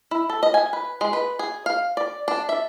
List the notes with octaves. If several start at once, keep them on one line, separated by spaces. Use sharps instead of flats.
E4
A4
D#5
G#5
B4
G#3
B4
G#4
F5
D5
D4
E5